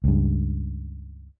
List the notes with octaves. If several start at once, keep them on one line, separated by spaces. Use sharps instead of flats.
C#2 G2